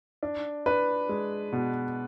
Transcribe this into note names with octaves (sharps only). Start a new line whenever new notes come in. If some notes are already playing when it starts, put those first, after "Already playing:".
D4
D4 B4
G#3
B2